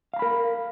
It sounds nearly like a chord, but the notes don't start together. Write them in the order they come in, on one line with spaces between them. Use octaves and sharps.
F5 A#5 B5 A#4